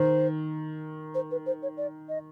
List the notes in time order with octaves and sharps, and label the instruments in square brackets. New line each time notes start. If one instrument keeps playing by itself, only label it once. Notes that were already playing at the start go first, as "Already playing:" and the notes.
Already playing: [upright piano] D#3 [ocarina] C5
[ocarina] C5
B4
C5
C#5
D5
D#5